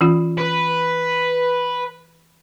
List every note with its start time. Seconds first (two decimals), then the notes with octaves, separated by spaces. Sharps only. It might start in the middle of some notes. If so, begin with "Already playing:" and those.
0.01 E3 C#4 F4
0.38 B4